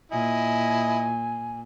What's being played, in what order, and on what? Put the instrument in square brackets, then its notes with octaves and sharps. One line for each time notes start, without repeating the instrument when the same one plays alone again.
[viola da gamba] A#2 [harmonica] E4 D#5 [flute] G#5